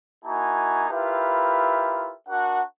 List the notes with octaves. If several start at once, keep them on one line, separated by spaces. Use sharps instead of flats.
A#3 D#4 E4 F#4 G#5 A5
E4 F4 G4 A#4 B4 E5
D4 F#4 A#4 F#5